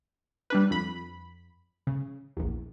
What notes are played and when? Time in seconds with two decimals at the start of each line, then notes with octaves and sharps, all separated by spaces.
0.50 G3 D4 B4
0.71 F2 B5
1.87 C#3
2.37 A#1 E2